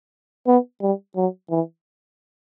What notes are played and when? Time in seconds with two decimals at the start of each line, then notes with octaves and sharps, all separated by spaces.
0.47 B3
0.82 G3
1.16 F#3
1.50 E3